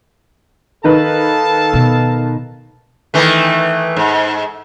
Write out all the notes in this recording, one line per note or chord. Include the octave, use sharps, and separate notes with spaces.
D#3 D#4 A4 B4 F5 A5
B2
D#3 E3 A3
G#2